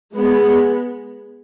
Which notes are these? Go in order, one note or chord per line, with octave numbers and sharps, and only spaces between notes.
G#3 B3